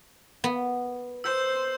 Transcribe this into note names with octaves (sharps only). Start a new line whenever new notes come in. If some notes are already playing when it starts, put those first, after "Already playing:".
B3
C5 E6 G6